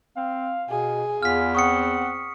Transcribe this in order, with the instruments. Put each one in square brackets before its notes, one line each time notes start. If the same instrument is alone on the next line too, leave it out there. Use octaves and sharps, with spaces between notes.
[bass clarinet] C4 [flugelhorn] F5
[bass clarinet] B2 [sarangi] G#4
[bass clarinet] E2 [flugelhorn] F4 [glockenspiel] F6 B6
[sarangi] C4 [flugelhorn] F#5 [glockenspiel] C#6 D#6 C#7